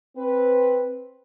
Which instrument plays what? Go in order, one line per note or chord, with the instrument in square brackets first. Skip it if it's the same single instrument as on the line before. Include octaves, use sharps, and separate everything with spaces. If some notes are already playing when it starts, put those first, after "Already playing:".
[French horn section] C4 B4